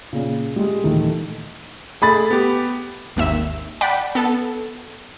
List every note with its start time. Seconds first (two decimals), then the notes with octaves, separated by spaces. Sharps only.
0.13 A#2 C#3
0.56 G3 G#3
0.83 D#1 D#3 E3 A3
2.02 A3 G#4 B5 A6
2.31 B3 G4
3.16 G#1 D#2 E5
3.81 D5 F#5 G5 B5
4.15 B3 A4